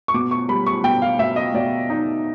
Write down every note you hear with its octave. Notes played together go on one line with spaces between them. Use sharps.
C#6
B2 D6
C#6
G3 B5
C#6
B2 G5
F5
B2 E5
D#5
B2 D5
D#4